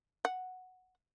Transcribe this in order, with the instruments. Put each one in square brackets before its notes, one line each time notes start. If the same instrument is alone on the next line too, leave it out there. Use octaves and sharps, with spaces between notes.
[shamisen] F#5